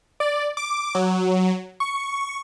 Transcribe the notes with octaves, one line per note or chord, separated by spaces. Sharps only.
D5
D6
F#3
C#6